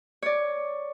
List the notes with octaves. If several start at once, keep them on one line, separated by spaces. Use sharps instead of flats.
C#5 D5